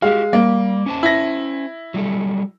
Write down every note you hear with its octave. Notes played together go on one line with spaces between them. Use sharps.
G#3 F#4 G4 F5
G3 A#3
C#4 C5 A5
E4 A#6
F#3 G3 A4